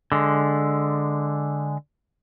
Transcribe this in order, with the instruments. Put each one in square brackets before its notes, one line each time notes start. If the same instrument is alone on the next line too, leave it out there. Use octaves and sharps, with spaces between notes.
[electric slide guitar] D3 G#3